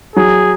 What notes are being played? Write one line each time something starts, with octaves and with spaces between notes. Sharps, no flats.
F#3 G#4